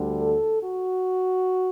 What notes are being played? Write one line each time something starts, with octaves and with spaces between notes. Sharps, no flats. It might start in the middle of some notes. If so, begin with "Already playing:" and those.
Already playing: D2 D3 G3
A4
F#4